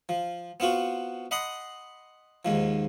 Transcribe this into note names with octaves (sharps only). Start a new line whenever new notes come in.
F3
B3 C4 F4 F#4
D#5 F#5 B5 C6 D#6
D#2 G#2 F3